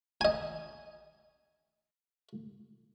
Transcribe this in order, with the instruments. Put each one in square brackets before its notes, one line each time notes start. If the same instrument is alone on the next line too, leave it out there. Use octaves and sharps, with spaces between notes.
[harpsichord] D#5 G#5